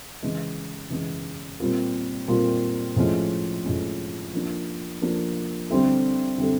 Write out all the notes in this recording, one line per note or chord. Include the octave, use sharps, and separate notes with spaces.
C#3 E3 G#3
C#3 E3 G#3
A#2 G3 C4 F4 A#4
A#2 G3 C4 F4 A#4
A2 F3 G#3 C#4
A2 F3 G#3 C#4
F3 A#3 D4
F3 A#3 D4
D3 G3 C4 E4 A4
D3 G3 C4 E4 A4